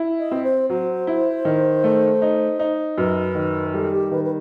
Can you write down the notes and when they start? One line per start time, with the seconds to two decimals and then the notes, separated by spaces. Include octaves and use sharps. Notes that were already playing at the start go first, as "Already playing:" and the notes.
Already playing: E4
0.19 D#5
0.31 C4
0.44 C5
0.70 F#3 C5
1.07 E4
1.45 D#3
1.84 A3
2.22 D#4
2.59 D#4
2.97 F#2 B4
3.35 D#3
3.73 G3 A4
3.93 G4
4.11 D#3 B4
4.24 B4